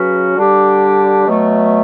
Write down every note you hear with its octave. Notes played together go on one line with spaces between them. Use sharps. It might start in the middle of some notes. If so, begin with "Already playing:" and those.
Already playing: C#3 F#3 C#4 F#4 B4
D3 G3 D4 G4
B2 F#3 A3